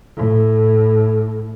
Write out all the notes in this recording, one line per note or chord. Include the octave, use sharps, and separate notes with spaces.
A2